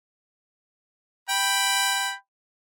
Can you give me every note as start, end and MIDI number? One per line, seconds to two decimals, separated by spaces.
1.29 2.13 79
1.29 2.13 83